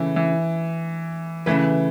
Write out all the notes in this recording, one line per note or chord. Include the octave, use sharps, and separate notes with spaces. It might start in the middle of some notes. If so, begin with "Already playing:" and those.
Already playing: C#3 E3 A3 E4
E3
C#3 E3 A3 E4 B4